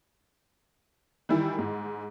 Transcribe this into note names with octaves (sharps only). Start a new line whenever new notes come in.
D#3 E3 G3 E4
G#2 G#3